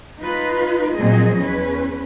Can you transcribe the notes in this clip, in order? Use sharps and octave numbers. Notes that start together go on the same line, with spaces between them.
D#4 F4 B4
A#2 F3 F#3 C4 G#4 D#5
E2 C#4 B4